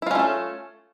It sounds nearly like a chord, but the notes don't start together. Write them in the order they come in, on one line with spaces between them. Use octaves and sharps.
E4 F4 C#4 A3 A4